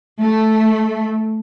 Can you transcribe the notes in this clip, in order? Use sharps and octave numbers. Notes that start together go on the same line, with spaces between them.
A3